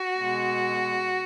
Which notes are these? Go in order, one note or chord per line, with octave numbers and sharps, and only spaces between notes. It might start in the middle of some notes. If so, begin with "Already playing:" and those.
Already playing: F#4
B2 G#3